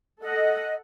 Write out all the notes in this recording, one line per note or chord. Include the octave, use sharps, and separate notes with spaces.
A4 D#5 F#5